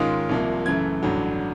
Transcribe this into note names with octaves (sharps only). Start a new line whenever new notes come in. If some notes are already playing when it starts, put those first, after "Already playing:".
Already playing: G#2 D#3 G#3 C#4 F4 D#6
C2 C3 F3 A#3
F#2 C#3 E3 A3 G#6
A1 G2 D3 F#3